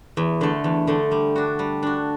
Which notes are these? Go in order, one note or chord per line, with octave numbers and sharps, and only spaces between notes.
E2
D3 A3
E2
D3 A3
G3
D4 F#4
G3
D4 F#4